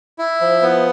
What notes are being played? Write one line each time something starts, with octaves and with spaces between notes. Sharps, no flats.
E4
F3
B3